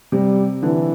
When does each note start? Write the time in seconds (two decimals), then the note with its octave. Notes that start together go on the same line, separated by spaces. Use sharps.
0.12 C3 G3
0.63 D3 E3